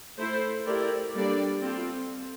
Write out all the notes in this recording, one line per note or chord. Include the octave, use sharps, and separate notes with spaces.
A3 E4 A4 C5
A3 E4 G4 A#4 D5
G3 A#3 D4 A4 D5
C4 F4 A4